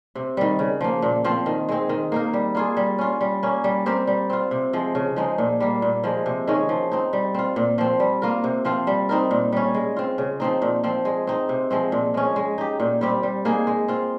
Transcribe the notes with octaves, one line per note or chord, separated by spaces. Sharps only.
C3
D#3 G3
C#3
F3 A#3
A#2
F3 C4 F4
D#3
G#3 C4
D#3
A#3 D#4 A#4
G3
A#3 F4 G#4
G3
C#4 F4
G3
A#3 C#4
G3
C4 G4 A#4
G3
C4 F4
C3
F3 G#3
C#3
F3 G#3 D#4
A#2
G3 A#3
A#2
F3 G#3
C3
D#3 G#3 C#4
F3
C4 D#4
G3
C4 F4
A#2
F3 C4
G3
A#3 F4 A#4
C3
F3 C4 F4
G3
C4 D#4 A#4
A#2
G3 C#4
G#3
C4 F4
C#3
F3 C4 D#4
A#2
F3 C4
G#3
C4 D#4
C3
F3 G#3 C4
A#2
G#3 C#4
G#3
D#4 G4
A#2
G3 C4 G4
G3
A#3 D#4 G#4
G#3
C4 F4